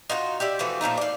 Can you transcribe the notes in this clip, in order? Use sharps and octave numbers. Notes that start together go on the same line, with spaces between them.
D#4 F4 F#4
G4 D5 E5
E3 F3 A3 F#4
A#2 F3 A3 D#4
D5 F5